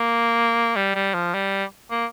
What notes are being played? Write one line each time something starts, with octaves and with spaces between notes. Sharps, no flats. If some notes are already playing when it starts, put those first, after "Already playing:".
Already playing: A#3
G3
G3
F3
G3
A#3